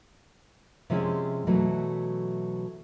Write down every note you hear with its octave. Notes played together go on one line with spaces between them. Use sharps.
C3 F3 G#3 C#4 E4 G#4
B2 E3 F#3 A3